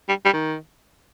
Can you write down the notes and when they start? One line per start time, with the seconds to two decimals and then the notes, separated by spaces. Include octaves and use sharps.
0.09 G3
0.25 G3
0.33 D#3